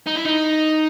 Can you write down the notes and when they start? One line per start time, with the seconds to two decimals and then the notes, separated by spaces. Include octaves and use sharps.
0.06 D#4
0.16 E4
0.25 D#4